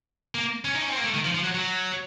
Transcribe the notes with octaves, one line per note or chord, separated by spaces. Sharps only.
A#3
C#4
D#4
C#4
C4
A#3
A3
D#3
F3
F3
F#3
F#3